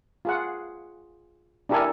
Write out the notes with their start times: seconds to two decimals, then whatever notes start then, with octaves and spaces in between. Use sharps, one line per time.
0.25 F4 G#4 F#5
1.69 D4 E4 G4 A4 A#4 G#5